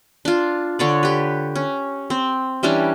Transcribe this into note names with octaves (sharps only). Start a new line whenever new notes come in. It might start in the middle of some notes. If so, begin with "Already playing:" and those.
D4 F4
D3 C#5 D5
G4 B4
C#4
C4
E3 G3 C#4 D4